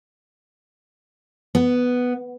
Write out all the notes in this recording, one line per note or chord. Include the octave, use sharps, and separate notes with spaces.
B3